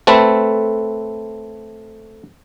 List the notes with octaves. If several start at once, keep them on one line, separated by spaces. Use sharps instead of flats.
A3 C4 A4 B4